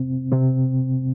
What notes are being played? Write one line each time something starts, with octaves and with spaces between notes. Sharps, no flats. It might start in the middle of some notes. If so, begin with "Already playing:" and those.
Already playing: C3 C4
C3 C4